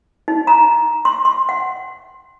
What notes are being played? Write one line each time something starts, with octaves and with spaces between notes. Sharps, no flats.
D#4
A#5
C6
C6
F#5